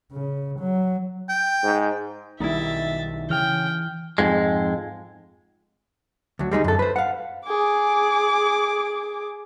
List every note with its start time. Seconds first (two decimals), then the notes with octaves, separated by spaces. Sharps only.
0.12 C#3
0.59 F#3
1.29 G5
1.63 G#2
2.40 B1 D#3 G3 D#4 E4 E5 A6
3.30 C#3 E3 G5 F6
4.18 F2 G#2 G#3
6.39 D2 F#3
6.51 G3 G#3 C#4 D#4
6.64 F#2 A4
6.79 B4 C5
6.96 F5 F#5
7.46 G#4 D6